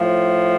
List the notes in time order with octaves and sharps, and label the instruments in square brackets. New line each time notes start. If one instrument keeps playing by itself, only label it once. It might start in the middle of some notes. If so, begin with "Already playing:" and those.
Already playing: [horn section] A2 F3